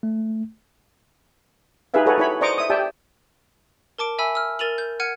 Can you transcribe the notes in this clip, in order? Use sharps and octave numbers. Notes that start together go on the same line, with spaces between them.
A3
D#4 G4 G#4 B4 E5 F5
F#4 G#4 A4 B4 C#5
E4 C#5 B5
C5 D5 D#5 A#5 C#6 D6
E5 D#6
G4 D5 E5 G5 A5
A#4 A5 D6 D7
E5 G#5 B5 E6
E6 F6
A#4 A6 D#7 F7 F#7
G6
F#5 F6 G#6 C#7 D#7